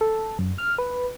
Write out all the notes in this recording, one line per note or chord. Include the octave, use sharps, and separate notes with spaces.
A4
F#2
F6
B4